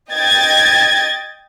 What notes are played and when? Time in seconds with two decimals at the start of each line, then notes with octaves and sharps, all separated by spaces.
0.10 D#5 G5 G#6 A6